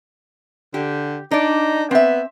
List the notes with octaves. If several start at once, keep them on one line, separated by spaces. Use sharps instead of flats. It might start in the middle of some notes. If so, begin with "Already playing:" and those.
D3 G4
D4 D#4 D5
B3 C4 E5